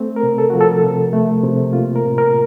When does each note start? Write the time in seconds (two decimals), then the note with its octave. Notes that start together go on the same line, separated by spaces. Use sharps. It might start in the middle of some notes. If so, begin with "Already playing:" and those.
Already playing: A3 C4
0.16 A#4
0.23 C3
0.38 A4
0.50 F3 F#4
0.61 A4
0.83 C3
1.13 A3
1.43 C3
1.73 A#3 F4
1.96 A#4
2.03 A2
2.18 A#4